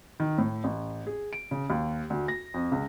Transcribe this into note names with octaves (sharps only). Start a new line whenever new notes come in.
D#3
A2
A1
G#4
D7
C#3
D#2
D2
A#6
F2
C#2